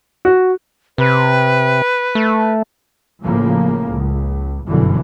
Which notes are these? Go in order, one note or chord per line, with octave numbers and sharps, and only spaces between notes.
F#4
C3 B4
A3
A1 A2 C#3 F3 A#3
C#2
G1 F#2 B2 D3 E3